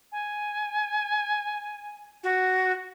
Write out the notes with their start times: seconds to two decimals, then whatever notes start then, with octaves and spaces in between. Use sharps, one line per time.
0.11 G#5
2.23 F#4